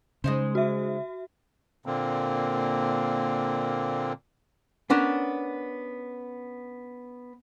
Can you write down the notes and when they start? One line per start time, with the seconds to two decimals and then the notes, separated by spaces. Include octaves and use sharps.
0.24 C#3 G#3 D#4 C5
0.55 F#4 E5
1.86 A#2 D3 A#3 C4
4.90 B3 C#4 D4 A#4